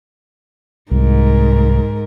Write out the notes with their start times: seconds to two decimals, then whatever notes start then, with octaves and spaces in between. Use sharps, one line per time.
0.91 C2 G#2 A#4